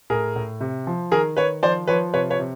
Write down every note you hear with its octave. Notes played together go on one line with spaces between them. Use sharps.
A2 G#4 A#4
A2
C3
F3
D#3 G#4 A#4
D#3 B4 C#5
F3 C5 D5
F3 B4 C#5
C3 B4 C#5
B4 C#5
C3